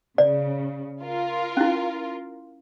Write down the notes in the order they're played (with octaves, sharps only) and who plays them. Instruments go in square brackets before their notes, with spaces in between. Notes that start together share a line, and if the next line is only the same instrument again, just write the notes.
[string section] C#3 [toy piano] D5
[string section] F4 A#4
[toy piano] C#4 E4